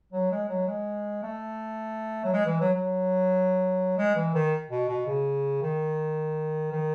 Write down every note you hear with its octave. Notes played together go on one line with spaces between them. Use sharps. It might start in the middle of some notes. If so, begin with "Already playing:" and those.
F#3
G#3
F#3
G#3
A3
F#3
G#3
E3
F#3
F#3
G#3
E3
D#3
B2
B2
C#3
D#3
D#3